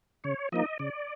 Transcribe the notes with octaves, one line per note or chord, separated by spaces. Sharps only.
C#3 C#5
F3 A#3 D#4 D#5
C#3 D5